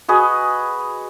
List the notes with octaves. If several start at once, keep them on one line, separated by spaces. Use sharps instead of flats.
F#4 G#4 B4 D#5